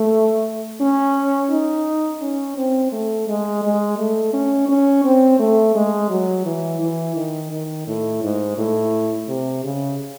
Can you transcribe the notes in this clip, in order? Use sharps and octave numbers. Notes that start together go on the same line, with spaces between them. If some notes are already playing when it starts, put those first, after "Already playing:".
Already playing: A3
C#4
D#4
C#4
C4
A3
G#3
G#3
A3
C#4
C#4
C4
A3
G#3
F#3
E3
E3
D#3
D#3
A2
G#2
A2
C3
C#3